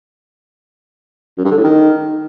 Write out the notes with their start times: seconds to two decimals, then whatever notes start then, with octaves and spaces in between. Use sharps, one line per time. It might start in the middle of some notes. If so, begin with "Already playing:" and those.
1.38 F#2
1.44 G2
1.51 D3
1.57 A2
1.64 D#3